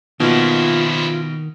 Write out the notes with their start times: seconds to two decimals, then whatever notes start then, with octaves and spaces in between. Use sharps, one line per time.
0.20 B2 D#3 F3 A#3 E4 F4